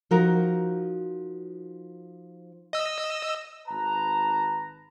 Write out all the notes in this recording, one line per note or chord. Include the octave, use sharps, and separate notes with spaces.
F3 D#4 F#4 A#4
D#5 E6
G#1 B4 A5 A#5